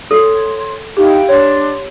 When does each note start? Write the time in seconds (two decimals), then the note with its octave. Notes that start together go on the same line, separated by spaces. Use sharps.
0.11 A4 C#5 C6
0.97 D#4 E4 G4 F5 G5
1.29 D4 C#5 C6